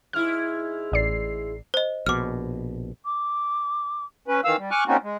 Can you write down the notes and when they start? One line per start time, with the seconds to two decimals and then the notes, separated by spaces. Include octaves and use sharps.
0.13 G#2 E4 F6
0.92 A1 D5 C7
1.74 C5 D#5
2.06 A#1 B2 D6 F6
3.05 D6
4.28 C#4 B4
4.44 D#3 E3 F5 E6
4.58 G3
4.71 G#5 C#6 D6 F6 F#6
4.87 A#3 C4 C#4 D#4 F4 F#4
5.03 G#3